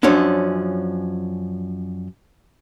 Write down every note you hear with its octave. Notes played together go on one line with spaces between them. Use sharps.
F#2 F3 C#4 D4